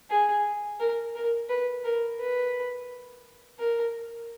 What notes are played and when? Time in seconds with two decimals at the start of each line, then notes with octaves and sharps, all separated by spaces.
0.10 G#4
0.79 A#4
1.15 A#4
1.49 B4
1.84 A#4
2.20 B4
3.59 A#4